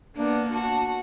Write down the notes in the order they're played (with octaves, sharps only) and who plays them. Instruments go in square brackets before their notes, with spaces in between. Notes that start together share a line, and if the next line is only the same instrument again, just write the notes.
[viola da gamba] A#3 B3 [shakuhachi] D4
[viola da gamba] F#4 [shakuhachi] A5